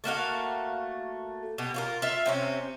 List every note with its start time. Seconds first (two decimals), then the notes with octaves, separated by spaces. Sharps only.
0.04 A3 A#3 F#4 F5
1.58 B2 G4
1.74 F4 F#4 A#4
2.02 F4 E5 F5
2.26 C3 C4 C#4